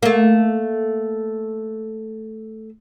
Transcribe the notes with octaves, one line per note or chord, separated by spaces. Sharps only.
A3 A#3